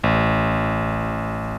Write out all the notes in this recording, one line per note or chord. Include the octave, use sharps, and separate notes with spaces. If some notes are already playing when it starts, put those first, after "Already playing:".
A1